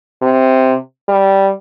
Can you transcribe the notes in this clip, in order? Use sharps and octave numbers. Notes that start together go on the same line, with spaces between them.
C3
G3